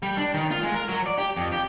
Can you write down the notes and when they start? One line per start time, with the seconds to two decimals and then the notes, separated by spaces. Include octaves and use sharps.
0.02 G3
0.17 D4
0.34 D#3
0.51 F4
0.63 G#3
0.74 A#4
0.88 F#3
1.06 D5
1.18 G4
1.36 F2
1.52 G4